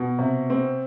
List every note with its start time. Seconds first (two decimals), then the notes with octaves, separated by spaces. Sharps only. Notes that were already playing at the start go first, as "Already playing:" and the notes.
Already playing: B2
0.19 C3
0.50 C4